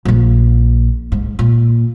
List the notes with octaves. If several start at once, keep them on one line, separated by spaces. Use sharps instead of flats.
A#1 A#3
G#2
A#2